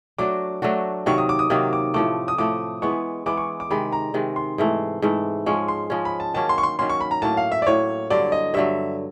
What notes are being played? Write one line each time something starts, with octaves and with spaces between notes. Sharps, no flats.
F#3 A3 D4 F#4 D6
F#3 A3 D4 F#4
C3 D#3 F#3 A#3 C#6
D#6
D6
D#6
C3 D#3 F#3 A#3 D#6
D6
A2 F3 A3 D6
D#6
A2 F3 A3 D6
E3 G#3 B3 C#6
E3 G#3 B3 D6
C#6
D6
C3 D#3 G#3 B5
A#5
C3 D#3 G#3
C6
G#2 E3 A3
G#2 E3 A3
F3 G#3 C#4 C#6
C6
F3 G#3 C#4
B5
A5
D#3 F#3 A#3 C#4 A5
C6
C#6
C6
D#3 F#3 A#3 C#4 C6
C#6
B5
A#5
A2 F#3 A#3 A5
F5
E5
D5
A2 F#3 A#3 C#5
G2 D3 F#3 D5
D#5
G2 D3 F#3 E5